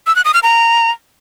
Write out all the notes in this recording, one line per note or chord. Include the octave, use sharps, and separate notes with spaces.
E6
F#6
D#6
F6
A#5